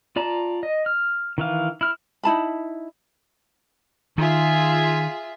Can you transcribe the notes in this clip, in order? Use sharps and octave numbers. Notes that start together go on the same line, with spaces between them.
F4 D5 A5 A#5
D#5
F6
D#3 E3 F5
E4 F6
D#4 E4 A5 B5
D#3 F4 G#4 E5